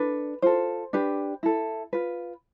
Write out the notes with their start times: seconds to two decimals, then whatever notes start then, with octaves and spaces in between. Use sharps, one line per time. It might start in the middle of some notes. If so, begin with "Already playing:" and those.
Already playing: D4 A4 B4
0.42 F4 A4 C5
0.93 D4 G4 B4
1.43 E4 A4
1.93 F4 B4